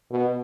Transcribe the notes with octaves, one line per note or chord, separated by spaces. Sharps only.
B2